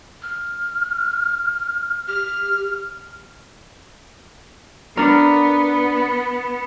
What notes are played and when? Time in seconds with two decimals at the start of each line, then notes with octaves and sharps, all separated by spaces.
0.22 F6
2.07 G4 F6
4.97 B3 D4 A#4